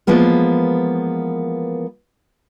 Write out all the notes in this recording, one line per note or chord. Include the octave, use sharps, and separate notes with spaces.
E3 F3 G#3 A#3 B3 A#4